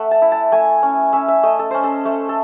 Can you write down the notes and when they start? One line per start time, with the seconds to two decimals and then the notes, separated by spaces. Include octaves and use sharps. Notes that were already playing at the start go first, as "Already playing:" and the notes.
Already playing: A3 E5 F#5
0.11 A5
0.22 E4
0.32 A5
0.52 A3 G#5
0.83 C#4
1.13 C#4 E5
1.28 E5
1.43 A3 D#5
1.59 A4
1.71 C#4 C5
1.84 A4
2.05 A3
2.29 A4